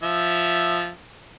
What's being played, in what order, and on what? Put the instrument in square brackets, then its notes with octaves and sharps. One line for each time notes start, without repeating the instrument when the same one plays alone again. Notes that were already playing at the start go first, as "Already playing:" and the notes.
[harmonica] F3 E5